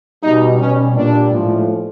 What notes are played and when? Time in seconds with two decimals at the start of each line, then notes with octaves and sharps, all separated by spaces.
0.23 B2 G3 D#4
0.60 B2 G3 C#4
0.96 A#2 G3 D4
1.32 A2 F3 G#3